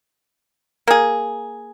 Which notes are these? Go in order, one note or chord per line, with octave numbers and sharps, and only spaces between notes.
A#3 G#4